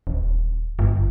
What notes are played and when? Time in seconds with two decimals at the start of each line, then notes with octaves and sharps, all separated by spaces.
0.07 D#1
0.79 G1